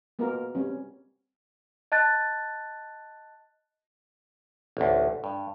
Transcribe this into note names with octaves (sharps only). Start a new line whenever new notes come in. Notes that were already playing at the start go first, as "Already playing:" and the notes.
G#3 A#3 B3 F4 F#4 A#4
G3 C4 C#4
D#5 A5 F#6 A6
A1 D2
G2